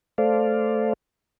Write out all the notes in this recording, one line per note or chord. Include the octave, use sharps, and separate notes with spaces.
A3 A4 C5 D5 F5